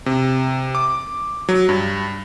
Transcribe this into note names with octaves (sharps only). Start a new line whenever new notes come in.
C3
D6
F#3
G2